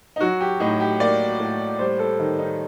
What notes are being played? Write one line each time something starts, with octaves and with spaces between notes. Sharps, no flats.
D#4
F#3 F#4
G4
A2 D#4
G4
A#3 D5
A2
G3 C5
A4
D#3 D#4
D#4